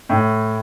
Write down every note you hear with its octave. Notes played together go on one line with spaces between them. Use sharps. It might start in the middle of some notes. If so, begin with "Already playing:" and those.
A2